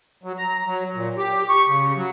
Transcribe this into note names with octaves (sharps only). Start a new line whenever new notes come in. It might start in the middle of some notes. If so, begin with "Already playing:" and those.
F#3
A#5
F#3
A#2
G4
C#6
C#3
F#3